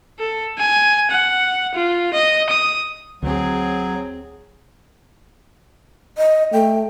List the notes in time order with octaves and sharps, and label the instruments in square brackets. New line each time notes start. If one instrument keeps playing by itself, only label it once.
[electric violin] A4
G#5
F#5
F4
D#5
D#6
[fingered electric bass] D2 [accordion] F#3 [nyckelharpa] C4 G#4
[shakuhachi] D#5
[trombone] A3 [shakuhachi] G5